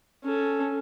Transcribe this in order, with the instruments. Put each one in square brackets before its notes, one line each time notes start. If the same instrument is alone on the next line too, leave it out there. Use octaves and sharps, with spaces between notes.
[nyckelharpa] C#4 A4